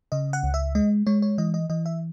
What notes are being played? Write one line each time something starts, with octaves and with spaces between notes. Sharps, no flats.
C#3 D#5
F#5
C#2
E5
G#3 D#5
G#3 C#5
C#5
E3 D#5
D#5
E3 D#5
E5